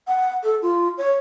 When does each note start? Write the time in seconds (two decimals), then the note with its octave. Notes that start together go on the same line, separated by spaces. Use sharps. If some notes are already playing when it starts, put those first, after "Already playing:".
0.07 F#5
0.43 A4
0.62 F4
0.98 C#5